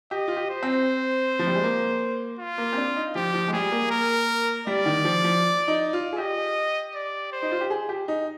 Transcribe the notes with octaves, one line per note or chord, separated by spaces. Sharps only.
G4 D#5
F4
G4
C5
C4
F3
G3
G#3
A#3
F4
A#3
C4
D4
D#4
F3 G4
F3
G#3
G3 G#4
A#3
A#4
G3 D5
D#3
F3
F3
D#4
F4
G#4
G4 D#5
D5
C5
D#4
F4
G4
G#4
G4
D#4